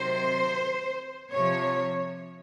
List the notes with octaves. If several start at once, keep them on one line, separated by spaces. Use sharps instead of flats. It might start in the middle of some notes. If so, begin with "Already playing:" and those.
Already playing: C3 D#3 F#3 C5
C3 F3 C#5